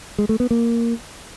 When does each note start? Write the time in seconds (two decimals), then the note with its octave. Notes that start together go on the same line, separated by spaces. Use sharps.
0.18 G#3
0.29 A3
0.40 B3
0.51 A#3